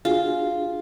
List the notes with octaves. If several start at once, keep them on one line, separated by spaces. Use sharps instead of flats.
D4 F4 F#4 G#4